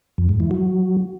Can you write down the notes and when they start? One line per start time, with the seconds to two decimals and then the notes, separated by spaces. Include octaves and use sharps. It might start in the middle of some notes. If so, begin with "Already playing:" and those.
0.18 F2
0.29 G#2
0.40 E3
0.51 F#3